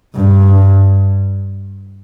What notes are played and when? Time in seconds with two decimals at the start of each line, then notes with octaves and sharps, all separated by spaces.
0.16 G2